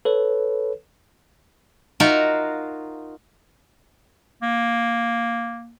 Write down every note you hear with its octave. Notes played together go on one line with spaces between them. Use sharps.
A4 B4 C#5
D#4 F4 F#4 A#4 E5 F5
A#3